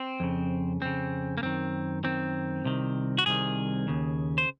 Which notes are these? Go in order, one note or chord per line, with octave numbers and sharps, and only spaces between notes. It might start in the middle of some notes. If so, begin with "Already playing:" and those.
Already playing: C4
F2 C#3
F2 C#3 C4
A#3
F#2 D#3 C4
F#2 D#3 C4
C2 C3 D#3
F#4
C2 C3 D#3 G#4
D#2 C#3
C5